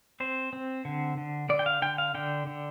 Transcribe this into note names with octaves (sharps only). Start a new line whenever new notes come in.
C4 C5
C4
D3
D3
D3 D5
G5
F5
D3 G5
F5
D3 G5
D3